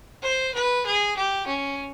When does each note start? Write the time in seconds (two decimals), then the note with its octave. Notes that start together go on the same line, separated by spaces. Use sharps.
0.23 C5
0.54 B4
0.86 G#4
1.17 G4
1.47 C#4